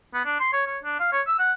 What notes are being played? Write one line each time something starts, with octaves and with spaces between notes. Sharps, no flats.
B3
D4
C6
C#5
C#5
D4
F5
C#5
E6
F#5